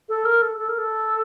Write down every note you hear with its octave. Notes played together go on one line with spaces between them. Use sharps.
A4
A#4
A4
A4
A#4
A4